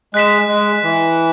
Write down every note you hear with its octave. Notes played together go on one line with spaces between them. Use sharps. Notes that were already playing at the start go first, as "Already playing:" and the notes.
G#3 F#6 B6 E7
G#3
E3